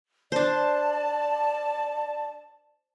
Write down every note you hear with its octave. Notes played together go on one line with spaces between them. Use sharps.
D4 C5 D5 A5